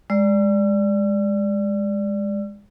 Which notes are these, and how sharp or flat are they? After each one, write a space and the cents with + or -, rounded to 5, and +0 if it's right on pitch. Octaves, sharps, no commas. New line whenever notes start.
G#3 -20 D5 +0 E6 +45